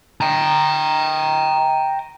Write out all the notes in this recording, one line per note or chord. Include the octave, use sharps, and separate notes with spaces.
G5 A#5